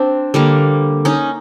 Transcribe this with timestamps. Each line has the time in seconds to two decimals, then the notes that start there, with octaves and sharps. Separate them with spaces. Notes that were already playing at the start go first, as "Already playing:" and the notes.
Already playing: C4 D4
0.34 D3 G3 A#3
1.05 C#4 D#4